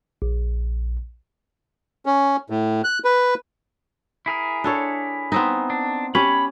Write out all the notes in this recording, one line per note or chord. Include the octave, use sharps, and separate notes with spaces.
A#1
C#4
A2
F#6
B4
E4 G#4 A#4
D4 A4 C#5
B3 C4 D#4
D4
C#4 G4 C#5 B5